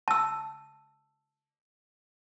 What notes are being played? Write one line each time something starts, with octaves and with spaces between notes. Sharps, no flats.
A5 E6